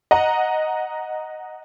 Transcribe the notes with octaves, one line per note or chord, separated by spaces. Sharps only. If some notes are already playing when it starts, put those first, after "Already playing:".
D#5 F#5 A#5